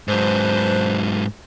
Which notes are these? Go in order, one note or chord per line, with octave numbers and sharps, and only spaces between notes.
G#2 F#3 D4 B4 C5